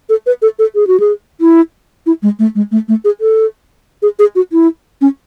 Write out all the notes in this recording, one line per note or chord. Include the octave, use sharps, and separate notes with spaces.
A4
B4
A4
A4
G#4
F#4
G#4
E4
E4
G#3
A3
G#3
A3
A3
G#4
A4
G#4
G#4
F#4
E4
C#4